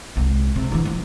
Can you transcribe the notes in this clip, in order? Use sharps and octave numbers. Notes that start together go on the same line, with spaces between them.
C2 G#3
C3
D3 E3
F3 C4